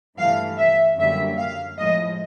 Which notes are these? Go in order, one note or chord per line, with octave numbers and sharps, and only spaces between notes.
G2 E3 A3 F5
E5
F#2 D3 G3 A#3 E5
F5
A2 F3 G#3 D#5